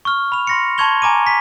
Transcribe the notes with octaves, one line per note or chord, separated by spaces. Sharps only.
C#6 F6
B5 F7
C6 A#6 C#7
A5 C6 C#6 G#6 F7 G7
G#5 A#5 D6 D#7
B6